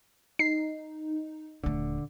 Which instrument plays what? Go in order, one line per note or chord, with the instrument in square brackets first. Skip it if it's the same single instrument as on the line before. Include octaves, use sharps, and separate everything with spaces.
[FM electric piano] D#4 [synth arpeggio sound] C7
[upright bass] D#1 A3 [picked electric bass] D3